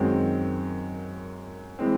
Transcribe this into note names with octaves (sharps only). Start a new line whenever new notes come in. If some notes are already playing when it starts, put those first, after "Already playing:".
Already playing: F#2 D#3 G#3 C4 F#4
E3 G#3 C4